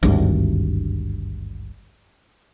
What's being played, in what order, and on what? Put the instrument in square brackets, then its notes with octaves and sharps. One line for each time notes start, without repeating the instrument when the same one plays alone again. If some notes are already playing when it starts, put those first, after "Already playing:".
[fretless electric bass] G#1 D2 G2